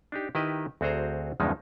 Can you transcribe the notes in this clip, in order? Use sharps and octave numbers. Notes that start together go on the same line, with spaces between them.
D4 D#4 G4
D#3 E4 G4 B4 D#5
D2 C4 F#4 G#4 C5 A#5
E2 G2 C#3 F3 G#3 D#4